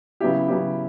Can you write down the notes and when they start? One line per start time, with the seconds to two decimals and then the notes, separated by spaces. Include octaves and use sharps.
0.20 C#3 F#3 B3 E4 G4
0.48 C#3 F#3 B3 E4 G4